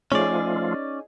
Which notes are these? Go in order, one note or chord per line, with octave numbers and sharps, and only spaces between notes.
F3 A3 C#4 D#4 F4 G#4 C#5 D5